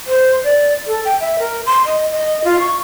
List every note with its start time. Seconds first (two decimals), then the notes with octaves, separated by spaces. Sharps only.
0.07 C5
0.44 D5
0.87 A4
1.05 G5
1.20 E5
1.39 A#4
1.66 C6
1.86 D#5
2.11 D#5
2.44 F4
2.60 C#6